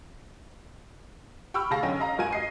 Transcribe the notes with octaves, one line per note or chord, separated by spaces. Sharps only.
G5 B5 C#6 E6 F6
D2 G#4 F5 A5 A#6
F#2 D3 C#4 D#5 G5
D#5 F5 A#5
G2 F#4 A#4 G#5 G#6 D#7
D#5 C7